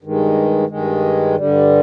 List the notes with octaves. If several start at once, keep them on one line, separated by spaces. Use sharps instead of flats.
G2 D#3 G#3
G2 D#3 G#3
G2 D3 G3